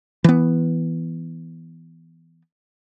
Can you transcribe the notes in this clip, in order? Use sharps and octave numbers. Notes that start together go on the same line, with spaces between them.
E3 B3